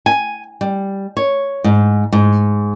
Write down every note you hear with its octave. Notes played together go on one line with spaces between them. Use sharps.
G#5
G3
C#5
G#2
G#2